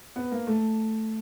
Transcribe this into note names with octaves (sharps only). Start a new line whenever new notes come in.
B3
A#3
A3